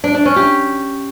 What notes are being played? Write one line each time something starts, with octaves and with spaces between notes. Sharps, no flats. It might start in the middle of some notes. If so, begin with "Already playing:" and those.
D4
D4
C#4
G4